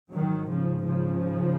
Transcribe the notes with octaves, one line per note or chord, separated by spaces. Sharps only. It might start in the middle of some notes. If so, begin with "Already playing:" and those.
G#1 G#2 D#3 F#3
C#3 F3
C#3 F3